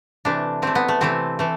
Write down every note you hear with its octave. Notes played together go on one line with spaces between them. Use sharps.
C3 E3 A3 D4
C3 E3 A3 C4
B3
A3
C3 E3 A3 C4
E3 A3